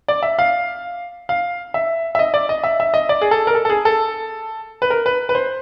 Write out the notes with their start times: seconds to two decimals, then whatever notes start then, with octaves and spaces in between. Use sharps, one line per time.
0.08 D5
0.23 E5
0.39 F5
1.29 F5
1.74 E5
2.15 E5
2.19 D#5
2.34 D5
2.49 D#5
2.64 E5
2.80 E5
2.94 D#5
3.09 D5
3.21 G#4
3.31 A4
3.47 A#4
3.55 A4
3.65 A4
3.70 G#4
3.85 A4
4.82 B4
4.90 A#4
5.06 B4
5.29 B4
5.35 C5